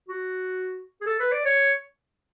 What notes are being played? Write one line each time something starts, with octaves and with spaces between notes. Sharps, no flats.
F#4
G#4
A4
B4
D5
C#5